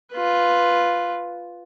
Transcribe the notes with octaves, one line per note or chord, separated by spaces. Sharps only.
F4 B4